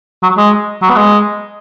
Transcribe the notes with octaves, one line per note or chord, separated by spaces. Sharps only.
F#3
G#3
F#3
B3
G#3